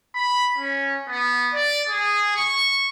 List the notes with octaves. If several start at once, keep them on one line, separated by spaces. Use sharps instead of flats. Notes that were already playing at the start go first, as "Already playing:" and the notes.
B5
C#4
B3
D5
G#4
C#6